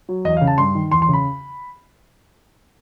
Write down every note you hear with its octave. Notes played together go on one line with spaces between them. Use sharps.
F#3
E2 D#5
F5
C#3
A5
G2 C6
D#3
E2 C6
C6
C#3
B5